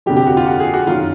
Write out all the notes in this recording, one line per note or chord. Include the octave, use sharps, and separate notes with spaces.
F1 F2 D3 F3 G4
G4
F#4
F4
F#4
G#4
F#4
F#2 D#3 F4